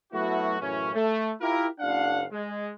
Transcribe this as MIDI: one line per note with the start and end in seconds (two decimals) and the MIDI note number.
0.13 0.57 54
0.13 0.57 57
0.13 0.57 59
0.13 0.57 64
0.13 0.57 66
0.60 0.90 42
0.60 0.90 45
0.60 0.90 49
0.60 0.90 52
0.60 0.90 61
0.94 1.32 57
1.41 1.66 64
1.41 1.66 65
1.41 1.66 67
1.41 1.66 70
1.80 2.24 30
1.80 2.24 62
1.80 2.24 77
1.80 2.24 78
2.32 2.71 56